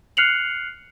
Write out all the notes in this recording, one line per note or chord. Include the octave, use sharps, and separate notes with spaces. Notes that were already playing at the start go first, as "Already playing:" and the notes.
F6 F#6 C7 C#7 F7 F#7